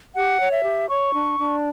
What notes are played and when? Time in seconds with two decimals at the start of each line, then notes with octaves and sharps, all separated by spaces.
0.14 G4 F#5
0.39 C#5
0.51 E5
0.64 G4
0.88 C#5 C#6
1.14 D4
1.38 D4